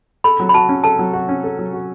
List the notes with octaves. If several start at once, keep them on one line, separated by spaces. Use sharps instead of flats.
A4 B5
F#3
B5
F#4 A5
C#4
A4 A5
F#3
F#4
C#4
A4
F#3
F#4